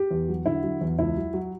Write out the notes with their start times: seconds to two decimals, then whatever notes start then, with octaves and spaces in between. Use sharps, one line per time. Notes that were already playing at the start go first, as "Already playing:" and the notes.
Already playing: G4
0.11 E2
0.28 F#3
0.46 D3 E4
0.63 F#3
0.81 E2
0.99 C#2 E4
1.17 F#3
1.34 F#3